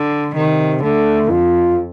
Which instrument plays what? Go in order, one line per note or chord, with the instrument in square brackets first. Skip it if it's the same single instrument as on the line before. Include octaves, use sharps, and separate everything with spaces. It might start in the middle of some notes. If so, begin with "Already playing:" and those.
Already playing: [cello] D3
[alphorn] C3 [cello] D#3
[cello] D3 [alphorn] A3
[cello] F2 [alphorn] F4